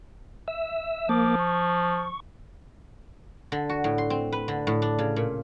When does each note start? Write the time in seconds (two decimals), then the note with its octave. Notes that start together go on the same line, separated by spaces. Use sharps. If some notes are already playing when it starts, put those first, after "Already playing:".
0.48 E5 E6
1.09 F3 A#3 D6
1.39 C#6
3.52 D3
3.69 F#4
3.84 A2
3.98 C6
4.10 C4
4.32 B4
4.48 D3
4.67 A2
4.82 D4
4.99 C#3
5.16 A#2